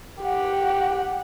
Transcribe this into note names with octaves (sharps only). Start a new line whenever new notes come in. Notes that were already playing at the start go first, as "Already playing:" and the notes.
G4 F#5